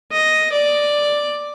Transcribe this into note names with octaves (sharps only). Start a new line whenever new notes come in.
D#5
D5